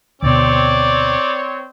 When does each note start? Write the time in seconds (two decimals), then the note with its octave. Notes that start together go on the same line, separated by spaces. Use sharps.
0.22 D2 B2 C4 C#5 D5